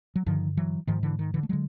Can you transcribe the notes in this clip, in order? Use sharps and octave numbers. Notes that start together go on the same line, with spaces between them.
F#3
G2 D3 D#3 F3
E3 F#3
G#2 D#3 F3
D3 E3
D#3
D3 E3
A3
D3 F#3 G#3